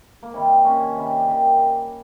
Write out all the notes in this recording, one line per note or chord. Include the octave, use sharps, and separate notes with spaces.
A#3
C3 D#3 G3 C4
A#3 C#4
C3 D#3 G3 G4 A#4
G4 A#4